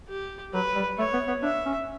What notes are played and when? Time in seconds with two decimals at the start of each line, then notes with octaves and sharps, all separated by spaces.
0.09 G4
0.53 F#3 B4
0.75 G3
0.98 A3 C#5
1.13 B3
1.28 B3
1.43 D4 E5
1.65 C#4